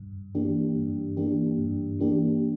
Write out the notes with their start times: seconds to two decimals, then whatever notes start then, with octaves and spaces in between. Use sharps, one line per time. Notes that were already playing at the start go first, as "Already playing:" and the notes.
Already playing: G2
0.35 E3 A#3 D4 G4
0.76 G2
1.17 E3 A#3 D4 G4
1.58 G2
1.99 E3 A#3 D4 G4